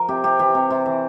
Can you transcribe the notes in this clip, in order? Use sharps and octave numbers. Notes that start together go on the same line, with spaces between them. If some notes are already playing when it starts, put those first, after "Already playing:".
Already playing: F3 A#4
C3 G4
C3 G4
E3 G4
C3
C3
E3